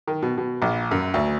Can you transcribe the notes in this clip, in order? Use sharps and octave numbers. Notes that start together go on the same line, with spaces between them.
D#3
B2
B2
A#1
F#2
D2